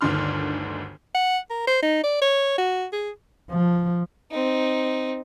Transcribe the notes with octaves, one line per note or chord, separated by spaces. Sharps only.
G1 D2 D#3 D4 C6 F6
F#5
A#4
C5
D#4
D5
C#5
F#4
G#4
F3
C4 D#4